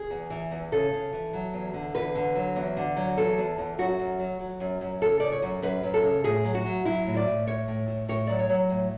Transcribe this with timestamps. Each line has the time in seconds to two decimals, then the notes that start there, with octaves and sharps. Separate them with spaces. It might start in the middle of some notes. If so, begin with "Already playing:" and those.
Already playing: G#4
0.10 E2
0.30 E3
0.51 E2
0.72 C#3 A4
0.92 C#3
1.13 E3
1.33 F#3
1.53 E2
1.74 D3
1.94 E2 B4
2.15 D3
2.35 F#3
2.56 E2
2.77 D3
2.96 F#3
3.17 E2 A4
3.38 E2
3.58 E2
3.79 F#2 F#4
3.99 F#2
4.19 F#3
4.40 F#3
4.60 F#2
4.81 F#2
5.01 C#3 A4
5.20 C#3 D5
5.32 C#5
5.42 F#2
5.62 F#2 B4
5.83 F#2
5.94 A4
6.04 C#3
6.24 A2 G#4
6.44 F#3
6.55 F#4
6.66 F#3
6.85 F#3 E4
7.06 A2
7.17 D5
7.26 A2
7.47 A2 C#5
7.68 A2
7.88 A2
8.09 A2 C#5
8.27 F#3 D5
8.39 C#5
8.50 F#3
8.70 A2